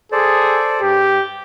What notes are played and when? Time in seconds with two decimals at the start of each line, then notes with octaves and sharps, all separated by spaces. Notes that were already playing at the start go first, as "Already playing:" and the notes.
0.12 G#4 A4 C5 D5
0.81 G2 G4